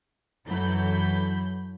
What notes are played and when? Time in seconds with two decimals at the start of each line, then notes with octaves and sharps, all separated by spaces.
0.48 F#2 E3 F#3 A4 B5 G6